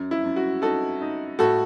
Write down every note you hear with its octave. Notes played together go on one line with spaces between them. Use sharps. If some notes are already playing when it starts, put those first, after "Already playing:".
Already playing: F#2
E4
F#2
F#4
D#4 F#4 A4
D#4
A2 F#4 A4